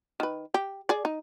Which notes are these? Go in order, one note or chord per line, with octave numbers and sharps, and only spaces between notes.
D#3 B4
G4
G#4 D5
D#4